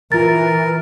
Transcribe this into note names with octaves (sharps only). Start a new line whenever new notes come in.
E3 F4 A#4 A6